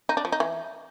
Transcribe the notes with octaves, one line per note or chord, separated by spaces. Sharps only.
D#4
D4
F3
D#4
E3